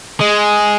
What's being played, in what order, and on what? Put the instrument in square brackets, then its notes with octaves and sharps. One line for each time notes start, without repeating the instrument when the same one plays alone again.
[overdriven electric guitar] G#3